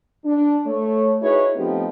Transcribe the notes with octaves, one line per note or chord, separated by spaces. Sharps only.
D4
A3 C#5
D#4 E4 F#4 G#4 B4 C#5
F3 A3 B3 C4 D#4 G4